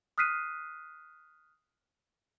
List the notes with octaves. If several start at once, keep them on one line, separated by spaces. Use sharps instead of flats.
D#6 F6 F#6 B6 C7 D#7